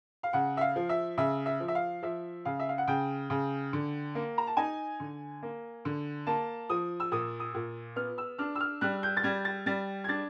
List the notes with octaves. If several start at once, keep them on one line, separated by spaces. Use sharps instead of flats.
F5
C#3 F#5
E5
F5
F3
E5
C#3 E5
E5
F3
E5
F5
F3 E5
C#3 F5
E5
F5
F#5
C#3 G5
C#3
D3
A#3
A#5
A5
D#4 G#5
D3
A#3
D3
A#3 A5
F3 D#6
E6
A#2 D#6
D#6
A#2
B3 F6
E6
D4 F6
E6
F6
G3 F#6
G6
A6
G3 G#6
A6
G3 A6
G#6
D4 A6